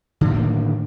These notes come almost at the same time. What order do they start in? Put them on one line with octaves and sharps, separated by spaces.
D3 A2 D#3 A#3